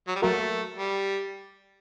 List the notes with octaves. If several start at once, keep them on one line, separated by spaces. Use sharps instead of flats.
F#3
G3
F#3 A3 A#3 F#4 A#4
G3